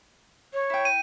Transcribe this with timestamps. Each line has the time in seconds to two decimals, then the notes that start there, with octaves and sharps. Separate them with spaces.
0.53 C#5
0.70 E4 G5
0.85 D#7